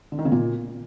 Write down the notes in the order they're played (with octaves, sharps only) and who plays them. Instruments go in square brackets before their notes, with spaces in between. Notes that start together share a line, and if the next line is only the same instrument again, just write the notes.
[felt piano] D3
D#3
C#3
A#2